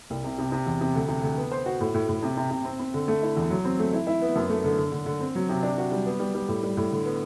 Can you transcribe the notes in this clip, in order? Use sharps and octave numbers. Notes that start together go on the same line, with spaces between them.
C2
C3
C3
C3
E2
C3
D2
C3
D2
B3
C5
F#4
A2
A2
A2
C3
C3
C3
C4
C4
D3
A3
E4
E2
F#3
C4
A3
E4
E4
B3
F#2
A3
D3
D3
D3
D3
C4
F#3
C3
D4
F#4
G3
B3
G3
G3
A2
G3
A2
D3
B3